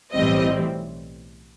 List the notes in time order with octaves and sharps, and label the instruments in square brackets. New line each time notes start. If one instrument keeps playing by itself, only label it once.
[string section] B1 A2 E3 G3 C4 D#5